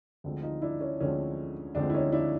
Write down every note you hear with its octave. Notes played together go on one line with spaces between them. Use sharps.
D2 D3 F3 G#3 C4
D#4 F4
D4 E4
C#4
D2 D3 F3 G#3 C4 C#4
D2 D3 F3 G#3 C4 D4
E4
C#4 D#4
D4 E4